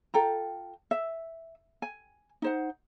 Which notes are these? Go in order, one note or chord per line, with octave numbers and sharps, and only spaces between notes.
F4 A4 G5 A#5
E5
G#5
D#4 C5 F#5